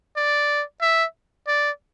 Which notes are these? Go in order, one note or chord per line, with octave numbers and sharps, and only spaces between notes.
D5
E5
D5